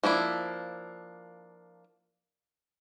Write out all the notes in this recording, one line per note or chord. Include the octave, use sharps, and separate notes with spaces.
F3 A#3 D4 E4